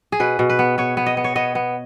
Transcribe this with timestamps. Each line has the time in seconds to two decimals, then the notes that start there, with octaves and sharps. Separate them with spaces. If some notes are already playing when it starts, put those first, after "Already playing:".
0.12 G#4
0.20 B2 B4
0.39 B2
0.49 B4
0.59 B3
0.78 B3 C#5
0.97 B3
1.06 D#5
1.17 B3
1.24 C#5
1.36 B3 D#5
1.55 B3